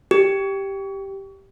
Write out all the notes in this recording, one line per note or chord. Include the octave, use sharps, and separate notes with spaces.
G4